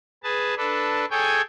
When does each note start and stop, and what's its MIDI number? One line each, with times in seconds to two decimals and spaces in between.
0.23 0.54 68
0.23 0.54 71
0.23 0.54 81
0.57 1.05 62
0.57 1.05 69
0.57 1.05 71
1.11 1.41 68
1.11 1.41 69
1.11 1.41 73
1.11 1.41 79
1.11 1.41 80